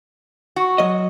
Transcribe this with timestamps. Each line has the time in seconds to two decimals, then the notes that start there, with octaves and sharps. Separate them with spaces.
0.56 F#4
0.78 F#3 D#5